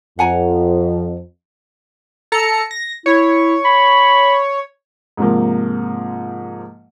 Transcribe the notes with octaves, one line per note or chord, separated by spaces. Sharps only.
F2 F#5 G#5 A#5
A4 A#5 C#7
A#6
E4 C#5
B5
G#2 C3 F3 A#3